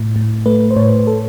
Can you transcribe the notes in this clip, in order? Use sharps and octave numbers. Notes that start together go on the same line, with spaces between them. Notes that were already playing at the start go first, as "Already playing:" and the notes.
Already playing: A2
A2
A3 B4
C5
A2 C#5
A4